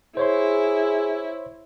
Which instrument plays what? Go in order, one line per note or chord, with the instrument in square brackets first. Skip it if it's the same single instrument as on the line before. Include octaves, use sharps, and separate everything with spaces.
[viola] E4 [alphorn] G#4 [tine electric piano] C5 C#5 C6